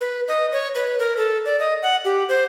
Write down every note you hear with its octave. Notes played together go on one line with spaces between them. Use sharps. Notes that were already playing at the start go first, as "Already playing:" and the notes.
B4
D#5
C#5
B4
A#4
A4
D5
D#5
F#5
G4
C5